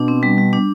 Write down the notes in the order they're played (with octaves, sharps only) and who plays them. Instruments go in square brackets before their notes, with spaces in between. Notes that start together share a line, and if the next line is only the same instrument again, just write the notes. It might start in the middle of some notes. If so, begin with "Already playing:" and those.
Already playing: [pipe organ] B2 [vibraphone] D4
[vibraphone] C4
G3
G3
D4